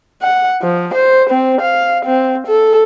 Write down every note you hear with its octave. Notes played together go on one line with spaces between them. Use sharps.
F#5
F3
C5
C4
F5
C4
A4